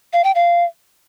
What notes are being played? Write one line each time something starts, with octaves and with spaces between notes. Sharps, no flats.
F5
G5
F5